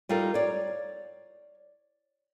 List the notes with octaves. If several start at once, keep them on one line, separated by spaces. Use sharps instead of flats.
G3 D#4 F4 A4 A#4
C#5 D5